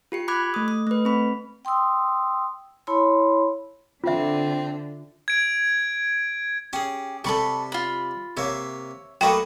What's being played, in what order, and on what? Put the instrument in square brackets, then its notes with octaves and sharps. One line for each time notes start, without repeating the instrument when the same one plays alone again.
[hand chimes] F4 G4 C#7
B5 D6 F#6 G#6
A3 D#6
D#6
A3 B4
C4 B5
[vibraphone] G5 C6 D#6 E6
E4 C#5 A5 B5 C6
[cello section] D3 D4 [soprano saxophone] C4 [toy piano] F4 E5
[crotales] G#6 D7
[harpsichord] C#4 [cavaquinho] G4 G#4
[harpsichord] C3 G3 [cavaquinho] A4 B5 C#6
[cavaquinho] F4 B5
[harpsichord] C3 A#3 [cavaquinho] C#5 E5
[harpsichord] F#3 A3 A#3 [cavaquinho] B4 D#5 C#6 [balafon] G5